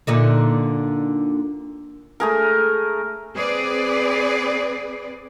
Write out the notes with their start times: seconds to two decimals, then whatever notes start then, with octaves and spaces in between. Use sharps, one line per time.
0.07 A#2 D3 D#4
2.20 A3 G#4 A#4
3.36 C4 G#4 B4 D5